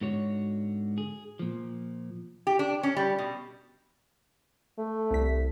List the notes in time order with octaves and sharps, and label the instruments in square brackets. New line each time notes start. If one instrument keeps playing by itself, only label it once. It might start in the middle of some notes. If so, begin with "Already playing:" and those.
[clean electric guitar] G#2 D3 F#4 C#5
G#4
A#2 F3
[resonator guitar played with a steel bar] G4
D4
C#4
G3
B2
[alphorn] A3
[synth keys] C2 B6